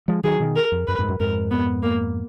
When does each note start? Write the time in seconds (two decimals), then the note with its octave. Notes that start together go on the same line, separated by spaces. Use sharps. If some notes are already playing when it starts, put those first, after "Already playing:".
0.08 F3 G#3
0.24 D#3 F#3 G#4
0.40 B2 D#3
0.56 A#4
0.72 F2
0.88 F#2 B4
0.98 F2 G#2
1.09 F#2
1.20 F2 G#2 A#4
1.51 B3
1.83 A#3